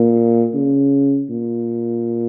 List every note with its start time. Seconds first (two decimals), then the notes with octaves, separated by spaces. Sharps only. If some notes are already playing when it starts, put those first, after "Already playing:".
Already playing: A#2
0.54 C#3
1.29 A#2